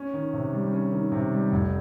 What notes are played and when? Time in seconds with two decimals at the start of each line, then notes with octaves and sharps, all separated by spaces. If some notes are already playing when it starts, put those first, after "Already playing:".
Already playing: C#4
0.13 D#3
0.33 C3
0.53 G3
0.73 C#4
0.92 D#3
1.12 C3
1.32 G3
1.52 F1